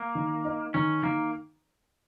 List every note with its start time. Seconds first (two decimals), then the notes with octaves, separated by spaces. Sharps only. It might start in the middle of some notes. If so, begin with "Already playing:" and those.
Already playing: A#3
0.15 D#3
0.45 D#4
0.74 D#3 C#4
1.03 D#3 A#3